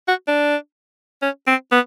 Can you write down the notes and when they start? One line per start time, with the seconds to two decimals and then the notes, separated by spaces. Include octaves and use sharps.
0.08 F#4
0.28 D4
1.22 C#4
1.47 C4
1.72 B3